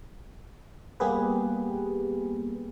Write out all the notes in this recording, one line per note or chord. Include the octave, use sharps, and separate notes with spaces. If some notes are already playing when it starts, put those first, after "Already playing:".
G3 A#3 B3 G4 G#4 B4